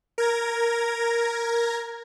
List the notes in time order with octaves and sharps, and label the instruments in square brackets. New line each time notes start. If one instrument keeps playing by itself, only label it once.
[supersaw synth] A#4 G#6 A#6